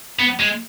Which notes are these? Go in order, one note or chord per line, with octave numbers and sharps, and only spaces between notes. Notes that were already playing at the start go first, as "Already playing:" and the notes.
B3
G#3